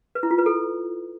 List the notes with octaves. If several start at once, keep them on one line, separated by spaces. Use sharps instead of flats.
B4
E4
F4
B4
A4